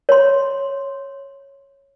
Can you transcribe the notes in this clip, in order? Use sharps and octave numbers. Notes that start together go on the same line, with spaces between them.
C#5 C6